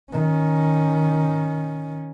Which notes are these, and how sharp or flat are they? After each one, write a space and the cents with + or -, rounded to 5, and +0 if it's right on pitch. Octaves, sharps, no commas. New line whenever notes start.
D#3 +5 C#4 +0